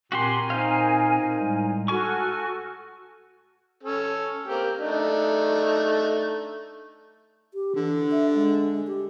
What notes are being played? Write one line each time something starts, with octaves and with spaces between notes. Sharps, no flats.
A#2 C4 F#4 G4 A#4 G#5 C6
D#4 C5 F5
A2 G3 G#3
F#4 A4 G#5 C#6 F6
C#4 A4
A#3 C4 G4
A3 D4 D#4
G4
D3 E3
E5
G#3
G4